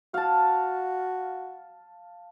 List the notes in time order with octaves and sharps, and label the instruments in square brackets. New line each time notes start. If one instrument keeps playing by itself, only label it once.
[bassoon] F#4 [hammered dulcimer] F5 A5